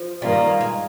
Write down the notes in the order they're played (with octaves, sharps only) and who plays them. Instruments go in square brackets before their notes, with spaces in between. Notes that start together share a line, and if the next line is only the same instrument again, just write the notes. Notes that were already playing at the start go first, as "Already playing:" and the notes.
Already playing: [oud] F3
[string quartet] G2 D#3 A#3 F4 [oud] G3
[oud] G#3